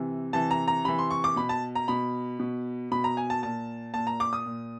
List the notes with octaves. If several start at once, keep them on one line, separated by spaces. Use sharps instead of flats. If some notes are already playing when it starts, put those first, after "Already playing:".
Already playing: C3 E3
C3 E3 A5
A#5
A#5
C3 E3 B5
C6
C#6
D6
B2 B5
A5
A#5
B2 B5
B2
B2 B5
A#5
G#5
A5
A#2 A5
A#2 A5
A#5
D6
D#6
A#2